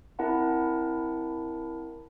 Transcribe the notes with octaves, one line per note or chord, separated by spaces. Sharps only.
C4 E4 A#4 F#5 A5